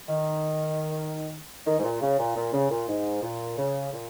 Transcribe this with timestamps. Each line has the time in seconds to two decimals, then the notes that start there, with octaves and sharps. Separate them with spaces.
0.09 D#3
1.67 D#3
1.79 G#2
1.84 A#2
2.01 C#3
2.19 A#2
2.36 A#2
2.53 C#3
2.70 A#2
2.89 G#2
3.23 A#2
3.58 C#3
3.93 A#2